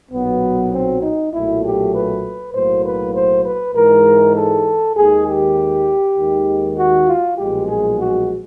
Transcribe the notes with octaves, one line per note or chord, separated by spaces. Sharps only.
B1 A#2 F#3 B3
C4
D#4
B1 A#2 F#3 A3 E4
G4
B4
B1 A2 F#3 A#3 C5
B4
C5
B4
G#2 E3 G#3 A#4
A4
D#2 D#3 G#3 G#4
G4
D#2 D#3 G#3
F#4
F4
B1 A#2 F3 G#3 G4
G#4
F#4